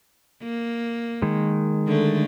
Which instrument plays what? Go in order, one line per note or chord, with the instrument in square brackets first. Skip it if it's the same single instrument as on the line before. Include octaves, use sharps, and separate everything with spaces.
[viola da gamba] A#3
[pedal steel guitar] D#3 G#3
[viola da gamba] D3 A3